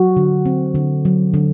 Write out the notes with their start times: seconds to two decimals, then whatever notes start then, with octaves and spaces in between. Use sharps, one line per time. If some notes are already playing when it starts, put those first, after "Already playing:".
Already playing: F#3 F#4
0.17 D3
0.46 C4
0.75 D3
1.05 F#3
1.34 D3